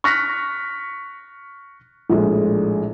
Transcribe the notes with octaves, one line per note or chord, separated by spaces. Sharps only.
C#6 F6 F#6 A#6 B6
A#1 A2 G#3